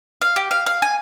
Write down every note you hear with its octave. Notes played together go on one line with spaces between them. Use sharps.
F5
G4
F5
F5
G#5